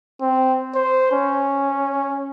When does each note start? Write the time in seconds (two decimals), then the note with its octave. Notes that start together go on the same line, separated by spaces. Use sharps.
0.21 C4
0.75 C5
1.12 C#4